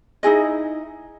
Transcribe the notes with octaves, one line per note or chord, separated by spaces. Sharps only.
D#4 E4 G#4 D#5